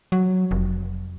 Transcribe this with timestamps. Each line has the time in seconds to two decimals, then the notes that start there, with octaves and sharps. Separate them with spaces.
0.12 F#3
0.51 F1